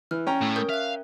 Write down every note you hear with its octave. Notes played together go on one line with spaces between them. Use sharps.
E3 F6
C#4 G5 A#5
A2 A3
A#4 D#6 G6
E5 F5 F#6